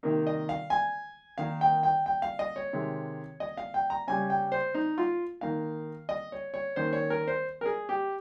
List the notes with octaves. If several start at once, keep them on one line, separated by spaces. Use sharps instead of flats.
C3 D#3 A#3 D#4
D#5
F5
G#5
D#3 A#3 D#4 F5
G5
G5
G5
F5
D#5
C#5
C3 D#3 G#3
D#5
F5
G5
A#5
C#3 G3 C#4 G#5
G5
C5
D#4
F4
D#3 A#3 D#4 F5
D#5
C#5
C#5
D#3 A#3 C#4 C5
C#5
A#4
C5
A#4
G#4
G4